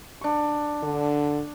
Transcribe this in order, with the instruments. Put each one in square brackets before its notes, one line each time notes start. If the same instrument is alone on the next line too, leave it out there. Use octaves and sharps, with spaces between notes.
[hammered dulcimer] D4 C#6
[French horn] D3